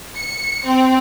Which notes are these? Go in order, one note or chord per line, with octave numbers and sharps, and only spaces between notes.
C#7
C4